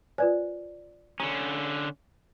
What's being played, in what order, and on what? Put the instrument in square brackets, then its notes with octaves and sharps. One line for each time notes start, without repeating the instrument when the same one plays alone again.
[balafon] F4 B4 G#5 [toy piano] C5 D5
[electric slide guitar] D3 C#4 [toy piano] A#5